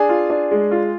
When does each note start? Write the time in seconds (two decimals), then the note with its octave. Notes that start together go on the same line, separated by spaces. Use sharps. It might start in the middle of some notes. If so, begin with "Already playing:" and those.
Already playing: D4 G#4 G#5
0.09 F4
0.30 D4
0.51 G#3
0.71 F4